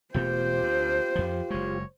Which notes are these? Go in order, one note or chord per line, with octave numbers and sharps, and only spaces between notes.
E1 B2 A3 F4 G4 C5 G5
D2
F2 F3
F#1 G#3 C#5